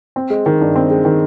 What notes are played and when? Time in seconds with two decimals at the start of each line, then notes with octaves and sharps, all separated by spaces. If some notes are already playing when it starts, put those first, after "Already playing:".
0.16 C4
0.30 G#3
0.46 D#3
0.61 G2
0.76 C4
0.91 G#3
1.05 D#3